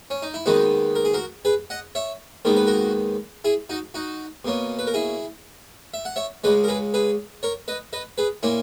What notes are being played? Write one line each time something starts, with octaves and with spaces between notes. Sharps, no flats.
C#4
D#4
E4
D#2 D#3 G#3 B3 D#4 F#4
A#4
G#4
F#4 A#4
G#4 B4
D#5 F#5
C#5 E5
D#2 D#3 G#3 B3 A#4
B4
F#4 A#4
E4 G#4
D#4 F#4
D#4 F#4
B2 A#3 C#4
B4
A#4
E4 G#4
E5
F#5
C#5 E5
C#2 C#3 G#3 B4 D#5
A#4
G#4 B4
G#4 B4
A#4 C#5
B4 D#5
B4 D#5
G#4 B4
A#2 A#3 C#4 E4